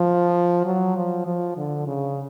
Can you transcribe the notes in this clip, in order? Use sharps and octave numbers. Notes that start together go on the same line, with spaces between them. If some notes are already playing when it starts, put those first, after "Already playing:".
Already playing: F3
F#3
F3
F3
D3
C#3